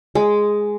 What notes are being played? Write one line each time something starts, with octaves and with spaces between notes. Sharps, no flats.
G#3